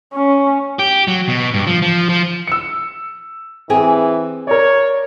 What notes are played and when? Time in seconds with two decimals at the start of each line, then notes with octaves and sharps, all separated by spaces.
0.14 C#4
0.79 G4
1.08 F#3
1.28 B2
1.54 G2
1.67 F3
1.82 F3
2.09 F3
2.47 E6 C#7
3.70 E3 C4 G4 G#4
4.47 A#4 C#5 D5